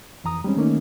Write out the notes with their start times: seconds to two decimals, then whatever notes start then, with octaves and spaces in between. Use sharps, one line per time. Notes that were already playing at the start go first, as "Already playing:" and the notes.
0.24 F2 E3 A#5 D#6
0.44 G3 G#3 C4 C#4
0.57 D#3 A3 A#3 C#4 D#4